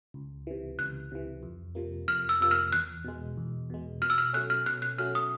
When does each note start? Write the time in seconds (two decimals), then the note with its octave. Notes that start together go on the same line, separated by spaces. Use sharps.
0.14 C#2
0.47 C3 E3
0.79 C#2 F#6
1.12 C3 E3
1.43 F2
1.75 C3 F3 A#3
2.08 F2 F6
2.29 E6
2.41 C3 F3 A#3 E6
2.51 F6
2.73 E2 F#6
3.04 B2 G#3
3.37 E2
3.70 B2 G#3
4.02 B2 F6
4.10 E6
4.18 F6
4.33 F#3 A3 C#4 F#6
4.50 F6
4.66 B2 F#6
4.82 F#6
4.98 F#3 A3 C#4 F6
5.15 D#6